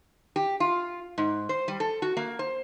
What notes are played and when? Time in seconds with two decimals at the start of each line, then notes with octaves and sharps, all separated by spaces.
0.36 G4
0.60 F4
1.18 G#2
1.49 C5
1.68 G3
1.80 A4
2.02 F#4
2.17 A#3
2.39 C5